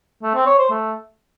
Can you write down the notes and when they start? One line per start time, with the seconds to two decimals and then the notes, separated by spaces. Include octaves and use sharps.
0.23 A3
0.34 C4
0.46 C#5
0.58 C5
0.70 A3